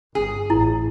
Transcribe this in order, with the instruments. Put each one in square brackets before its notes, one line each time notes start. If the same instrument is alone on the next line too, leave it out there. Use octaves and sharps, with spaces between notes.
[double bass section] G1 [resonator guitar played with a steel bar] G#4
[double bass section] A1 [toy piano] E4